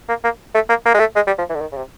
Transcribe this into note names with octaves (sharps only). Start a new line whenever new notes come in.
A#3
A#3
A3
A#3
A#3
G#3
A3
G#3
G3
F3
E3
D3
D#3
C#3
C3